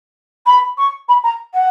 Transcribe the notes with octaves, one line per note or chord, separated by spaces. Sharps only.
B5
C#6
B5
A#5
F#5